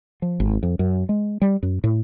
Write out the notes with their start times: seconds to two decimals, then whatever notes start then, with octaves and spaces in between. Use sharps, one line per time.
0.22 F3
0.40 G#1
0.63 F2
0.79 F#2
1.09 G#3
1.42 G3
1.63 F#2
1.84 A2